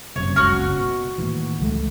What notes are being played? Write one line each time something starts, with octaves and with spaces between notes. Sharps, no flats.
F#1 F#2 C3 C#5
F#1 C#2 F#4 C#6 F6
B2
D#2 A2 E3
C#2 F#3 A3